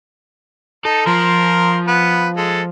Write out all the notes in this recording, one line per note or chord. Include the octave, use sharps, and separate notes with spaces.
D#4 A4
F3 A#4 C6
B3 B4
G#3 A4